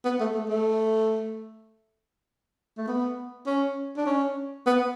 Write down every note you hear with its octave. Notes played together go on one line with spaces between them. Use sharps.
B3
A3
A3
A3
A3
B3
C#4
D4
C#4
B3